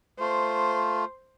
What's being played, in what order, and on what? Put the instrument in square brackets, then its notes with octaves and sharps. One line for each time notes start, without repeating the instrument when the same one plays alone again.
[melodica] A3 F4 [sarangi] C5